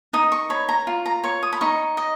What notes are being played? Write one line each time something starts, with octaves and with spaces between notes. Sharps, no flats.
D#4 D#6
C#6
C#5 B5
A#5
F4
A#5
C#5 C#6
D#6
B5
D#4 C#6
D#5